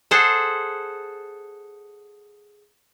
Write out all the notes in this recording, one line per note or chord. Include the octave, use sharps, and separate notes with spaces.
G#4 A4 C5 F#5